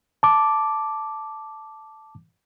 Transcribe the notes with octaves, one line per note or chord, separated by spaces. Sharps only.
A5 D6